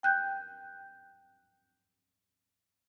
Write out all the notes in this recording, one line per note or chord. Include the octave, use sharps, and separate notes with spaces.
G5 F#6 G6